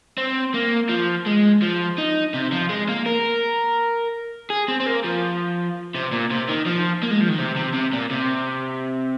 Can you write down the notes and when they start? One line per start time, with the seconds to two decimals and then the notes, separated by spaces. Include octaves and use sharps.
0.18 C4
0.54 A#3
0.89 F3
1.27 G#3
1.62 F3
1.98 D#4
2.34 C3
2.52 F3
2.69 G#3
2.88 A#3
3.06 A#4
4.50 G#4
4.68 C4
4.80 C4
4.87 A#3
5.04 F3
5.94 C3
6.12 A#2
6.30 C3
6.48 D#3
6.66 F3
7.02 A#3
7.11 G#3
7.21 F3
7.29 D#3
7.39 C3
7.56 C3
7.74 C3
7.93 A#2
8.11 C3